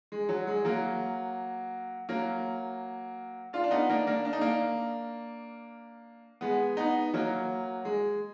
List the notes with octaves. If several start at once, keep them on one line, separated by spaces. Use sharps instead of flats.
G#3
F#3
G#3
F#3 A#3
F#3 A#3
D4 F4
D4
B3 D#4
A#3 D4
A#3 D4
D4
D#4
A#3 D4
G#3 B3
B3 D#4
F#3 A#3
G#3